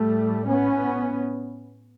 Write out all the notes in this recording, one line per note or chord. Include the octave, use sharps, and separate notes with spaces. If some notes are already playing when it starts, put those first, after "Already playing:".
Already playing: A2 G3 A3
B3 C#4